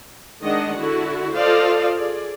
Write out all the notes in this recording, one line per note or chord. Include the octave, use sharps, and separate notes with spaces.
D#3 G#3 D4 D#5 F#5
D3 E4 F#4
F4 A4 C5 D5 D#5 F5
G#4 D5